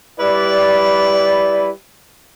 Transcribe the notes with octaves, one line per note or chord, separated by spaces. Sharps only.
G3 E4 B4 D5